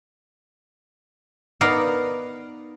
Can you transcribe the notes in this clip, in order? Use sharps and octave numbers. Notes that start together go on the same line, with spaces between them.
B3 D#4 A#4 D5 F5 F#5